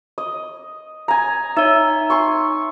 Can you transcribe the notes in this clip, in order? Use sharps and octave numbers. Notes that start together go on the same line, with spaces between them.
D#5
G#5 A#5
D#4 C#5 E5
G#5 C6 C#6